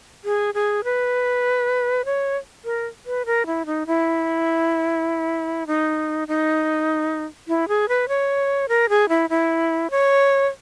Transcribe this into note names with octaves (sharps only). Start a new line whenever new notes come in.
G#4
G#4
B4
C#5
A#4
B4
A#4
E4
D#4
E4
D#4
D#4
E4
G#4
B4
C#5
A#4
G#4
E4
E4
C#5